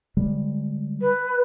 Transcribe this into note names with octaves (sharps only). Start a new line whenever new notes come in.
D3 G3 G#3
B4